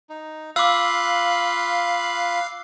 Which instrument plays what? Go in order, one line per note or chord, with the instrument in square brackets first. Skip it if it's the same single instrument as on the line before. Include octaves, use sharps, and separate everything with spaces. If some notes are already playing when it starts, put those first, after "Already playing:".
[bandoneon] D#4
[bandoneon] F4 B5 F#6 [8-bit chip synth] F5 [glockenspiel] D6 E6